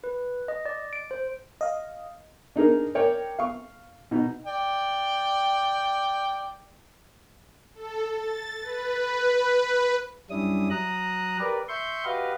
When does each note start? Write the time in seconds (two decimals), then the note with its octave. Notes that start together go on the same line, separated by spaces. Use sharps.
0.04 B4
0.48 D#5
0.66 D5
0.93 D7
1.11 C5
1.61 D#5 F5
2.56 D4 D#4 G#4 A#4
2.95 A#4 C#5 D5 G5
3.39 F5 C#6
4.11 B2 D#4
4.47 D5 G5
7.74 A4
8.14 A6
8.61 B4
10.30 F#2 G3 C#4 D4 E4 D#6
10.70 F#3 A#5 D#6 F#6
11.39 G4 A#4 B4 D5
11.68 E5 C6 C#6 G6
12.05 F#4 G4 B4 D#5 F5